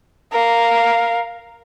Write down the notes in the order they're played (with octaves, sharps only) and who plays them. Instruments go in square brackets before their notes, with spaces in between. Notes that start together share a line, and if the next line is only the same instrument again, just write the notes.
[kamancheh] A#4 F5